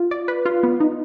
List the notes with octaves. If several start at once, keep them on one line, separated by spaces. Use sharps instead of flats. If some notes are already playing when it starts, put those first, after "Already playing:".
Already playing: F4
D5
B4
F4
B3
D#4